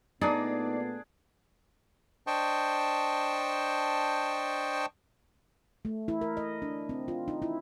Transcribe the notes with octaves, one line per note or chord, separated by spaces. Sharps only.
A#2 A3 B3 D4 D#4 G#4 D5
D4 C5 D#5 G5 A5 C#6
A3
E4
A#4
D#5
D4
C4
F4
D#4
E4